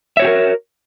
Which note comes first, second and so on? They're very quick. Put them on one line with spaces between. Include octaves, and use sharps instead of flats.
E5 C#5 F#4 G4 A#4